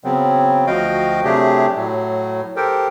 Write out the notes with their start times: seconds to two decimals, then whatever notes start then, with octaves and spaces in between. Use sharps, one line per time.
0.04 C#3 F#3 B3 C4
0.67 D2 F3 F#4 D#5 F5 G5
1.24 C3 F#3 A3 D4 G4 G#4
1.77 A2 F#3
2.56 G4 A4 A#4 C5 G5